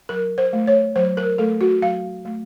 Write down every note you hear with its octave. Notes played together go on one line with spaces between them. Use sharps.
F#3 A#4
C5
A3
C#5
F#3 C5
A#4
A3 A4
F#4
F#3 F5
A3